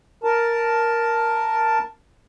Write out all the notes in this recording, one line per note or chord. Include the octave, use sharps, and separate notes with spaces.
A#4 A5